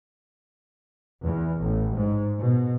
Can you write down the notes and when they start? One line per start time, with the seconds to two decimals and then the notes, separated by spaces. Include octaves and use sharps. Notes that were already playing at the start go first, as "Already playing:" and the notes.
1.23 E2
1.59 A1
1.94 G#2
2.38 B2